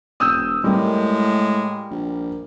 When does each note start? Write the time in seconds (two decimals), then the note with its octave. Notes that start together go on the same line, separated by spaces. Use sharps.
0.20 E1 D#6 E6 G6
0.64 A2 G3 G#3 A#3
1.91 A#1